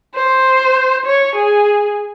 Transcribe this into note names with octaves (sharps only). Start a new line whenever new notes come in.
C5
C#5
G#4